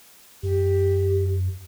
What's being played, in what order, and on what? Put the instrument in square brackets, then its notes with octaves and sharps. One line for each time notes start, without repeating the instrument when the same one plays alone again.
[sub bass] F#2 [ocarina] G4